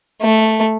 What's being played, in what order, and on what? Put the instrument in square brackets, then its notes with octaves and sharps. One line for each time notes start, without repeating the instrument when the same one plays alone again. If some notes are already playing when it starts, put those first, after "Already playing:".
[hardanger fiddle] A3